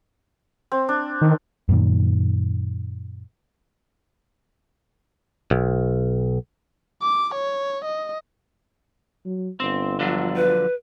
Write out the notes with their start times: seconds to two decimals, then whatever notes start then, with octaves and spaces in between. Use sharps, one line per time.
0.72 C4
0.89 D4
1.21 D#3
1.69 F#2 A#2 D#3
5.51 B1
7.02 D6
7.35 C#5
7.85 D#5
9.25 F#3
9.60 G1 C4
10.00 D3 F3 F#3
10.36 B4